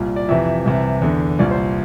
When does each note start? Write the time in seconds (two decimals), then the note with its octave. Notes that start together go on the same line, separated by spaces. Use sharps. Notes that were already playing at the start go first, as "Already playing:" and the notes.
Already playing: C2 A#2
0.16 D5
0.29 F2 C3 E3 E5
0.65 C2 C3 E3 E5
1.02 E2 D3
1.39 C2 A#2 D5
1.51 C5